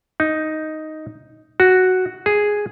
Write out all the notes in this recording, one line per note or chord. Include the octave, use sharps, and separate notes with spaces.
D#4
F#4
G#4